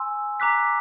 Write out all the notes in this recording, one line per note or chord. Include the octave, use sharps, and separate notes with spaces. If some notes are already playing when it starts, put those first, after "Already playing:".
Already playing: G#5 C6 E6
A#5 D6 F#6 B6